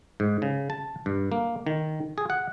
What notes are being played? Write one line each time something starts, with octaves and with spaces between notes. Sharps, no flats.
G#2
C#3
A5
G2
A#3
D#3
G#4
F#5